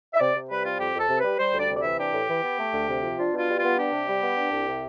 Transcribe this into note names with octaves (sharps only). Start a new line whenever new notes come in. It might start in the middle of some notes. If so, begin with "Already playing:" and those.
E5
C3 D5
C3
G3 B4
C4 F4
F2 G4
F2 A4
C3
B4
G3
G3 C5
D2
D5
C3
D5
E3 E5
D4 G4
A2
E3
B3
A3
D2
C3
F3
D4 F4
B2 F4
G3
F4
B3
D4 G4
C3
G3
B3
D4
C2
C3